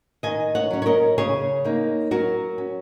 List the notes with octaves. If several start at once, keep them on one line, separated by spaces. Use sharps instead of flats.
D#3 D#5 G#5
C#5 F#5
F#3 C#4
C#5
A#4 D#5
C#3 G#4 C#5
A#3 D#4
F#3 F#4 A#4
C#4